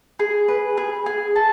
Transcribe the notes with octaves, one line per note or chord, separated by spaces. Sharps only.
G#4
B4
G#4
G#4
A5